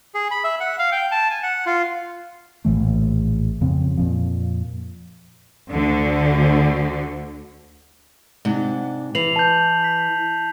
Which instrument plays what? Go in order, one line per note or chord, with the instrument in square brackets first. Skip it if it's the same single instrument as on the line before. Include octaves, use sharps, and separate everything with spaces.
[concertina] G#4
B5
E5
F#5
F5
G5
A5
G#5
F#5
F4
[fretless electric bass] A#1 A2 E3 A3
F2 C#3 F3 C4
F2 A#2 F3
[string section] D2 D3
[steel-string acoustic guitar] G#2 C3 D4
[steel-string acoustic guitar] E3 [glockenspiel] C7 F7 F#7
[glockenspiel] A5 G6
B6